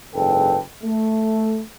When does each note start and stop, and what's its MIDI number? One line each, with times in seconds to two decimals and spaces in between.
0.14 0.58 30
0.14 0.58 44
0.14 0.58 69
0.14 0.58 71
0.14 0.58 79
0.84 1.60 57